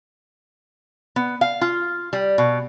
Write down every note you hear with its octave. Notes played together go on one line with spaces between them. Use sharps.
B3
F5
F4
G3
B2